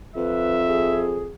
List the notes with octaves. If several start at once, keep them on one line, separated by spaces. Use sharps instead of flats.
F2 B4 E5
G#4